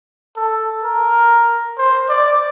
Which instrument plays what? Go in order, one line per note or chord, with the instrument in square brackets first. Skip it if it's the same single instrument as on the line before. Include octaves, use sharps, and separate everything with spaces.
[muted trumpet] A4
A#4
C5
D5